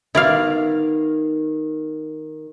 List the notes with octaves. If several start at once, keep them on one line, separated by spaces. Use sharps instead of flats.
D#3 B3 E4 D5 F5